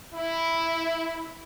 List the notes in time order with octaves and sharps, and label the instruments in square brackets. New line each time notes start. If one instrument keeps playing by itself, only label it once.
[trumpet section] E4